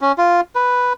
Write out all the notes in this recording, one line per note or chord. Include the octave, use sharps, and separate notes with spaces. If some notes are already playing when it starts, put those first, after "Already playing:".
C#4
F4
B4